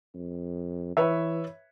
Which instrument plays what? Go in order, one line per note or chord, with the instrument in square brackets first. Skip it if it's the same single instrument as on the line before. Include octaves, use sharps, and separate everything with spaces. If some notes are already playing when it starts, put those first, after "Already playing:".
[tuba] F2
[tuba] E3 [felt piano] B4 C#5 E5